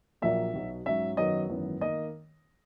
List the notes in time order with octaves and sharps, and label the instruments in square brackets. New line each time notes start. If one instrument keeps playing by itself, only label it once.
[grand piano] A#1 A#2 F#3 A#3 E5
B1 B2 F#3
G#2 F#3 C#4 E5
F#2 D#3 F#3 B3 D#5
G#1 F#2 E3 B3
D#3 A#3 D#5